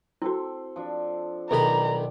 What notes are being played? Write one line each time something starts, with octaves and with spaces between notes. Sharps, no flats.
C4 E4 F#4 A4
F3 D4
B1 D#3 G#4 A4 D5 G5 A#5 B5